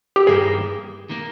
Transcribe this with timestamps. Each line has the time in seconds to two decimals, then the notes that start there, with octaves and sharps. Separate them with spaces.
0.16 G4
0.27 G2 D#3 A#3 G#4
1.09 D#3 A#3